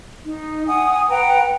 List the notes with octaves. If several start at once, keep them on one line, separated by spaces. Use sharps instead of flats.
D#4
F#5 G#5 D#6
B4 F#5 G5 A#5